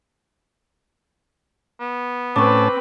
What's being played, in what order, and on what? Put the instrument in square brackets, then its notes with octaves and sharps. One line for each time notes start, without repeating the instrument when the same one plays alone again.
[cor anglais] B3
[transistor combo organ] A2 C#4 A5 [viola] C4 B4 [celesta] C#6 D6